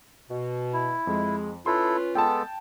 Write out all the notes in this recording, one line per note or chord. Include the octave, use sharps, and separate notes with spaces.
B2
E4
F2 G#3
C#4 E4 F4 A4 B4 C6
G#3 B3 A4 G5 A5